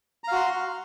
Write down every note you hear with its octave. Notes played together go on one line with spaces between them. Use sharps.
F#4 F5 A#5 C6